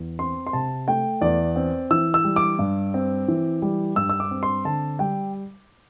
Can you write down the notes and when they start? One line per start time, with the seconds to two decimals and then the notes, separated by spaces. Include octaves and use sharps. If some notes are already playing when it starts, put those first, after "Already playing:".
Already playing: E2
0.19 C4 C6
0.47 C6
0.53 C3 A5
0.88 A3 G5
1.21 E2 D5
1.56 C4
1.91 E3 E6
2.14 E6
2.24 G3
2.36 D6
2.59 G2
2.94 C4
3.28 E3
3.62 G3
3.96 G2 E6
4.09 E6
4.20 D6
4.31 C4
4.43 C6
4.65 D3 A5
4.99 G3 G5